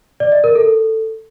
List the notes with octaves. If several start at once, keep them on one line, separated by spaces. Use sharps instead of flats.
D5
D#5
A#4
A4